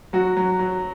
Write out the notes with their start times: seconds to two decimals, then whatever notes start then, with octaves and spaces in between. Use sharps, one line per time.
0.13 F#3 F#4
0.37 F#3
0.59 F#3